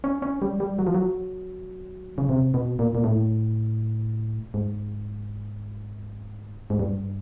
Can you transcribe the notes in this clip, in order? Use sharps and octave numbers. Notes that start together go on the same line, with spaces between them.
C#4
C#4
G3
G3
F#3
F3
F#3
C#3
C3
B2
A#2
A#2
A2
G#2
G#2
G2